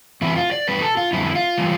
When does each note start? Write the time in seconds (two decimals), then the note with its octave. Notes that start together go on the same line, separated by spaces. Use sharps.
0.21 E2 C3 E3 E4
0.36 F4
0.52 D5
0.67 E2 B2 G3 D4 B4
0.82 A4
0.97 F4
1.13 F2 D3 G3 C4 E4
1.35 F4
1.57 C3 E3 G3